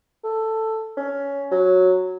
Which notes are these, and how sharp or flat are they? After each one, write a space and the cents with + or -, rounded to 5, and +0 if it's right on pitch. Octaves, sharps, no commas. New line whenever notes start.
A4 +10
C#4 +15
F#3 -5